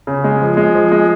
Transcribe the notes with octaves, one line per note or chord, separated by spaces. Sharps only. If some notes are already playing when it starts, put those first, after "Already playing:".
C#3
G#3
F3
G#3
F3
G#3